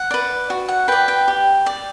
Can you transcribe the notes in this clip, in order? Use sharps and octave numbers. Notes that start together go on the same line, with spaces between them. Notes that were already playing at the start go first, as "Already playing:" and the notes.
Already playing: F#5
B4 D5
F#4
F#5
B4 D5 G5
G5
G4
D5